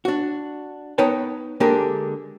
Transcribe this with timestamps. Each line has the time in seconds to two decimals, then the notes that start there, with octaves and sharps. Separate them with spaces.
0.05 D4 F#4
0.98 B3 D#4 B4 C#5 G5 A5
1.60 D3 G#3 A#3 D4 G4 A#4